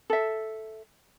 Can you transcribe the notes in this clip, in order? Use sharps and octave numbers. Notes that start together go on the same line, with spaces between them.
A4 E5